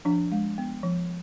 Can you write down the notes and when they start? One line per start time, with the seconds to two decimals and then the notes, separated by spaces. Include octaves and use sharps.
0.05 F3 D4
0.32 G#3
0.58 B3
0.83 F3